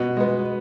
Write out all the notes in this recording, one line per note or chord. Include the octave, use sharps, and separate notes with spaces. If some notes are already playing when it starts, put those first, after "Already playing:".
Already playing: B2
G#3 B3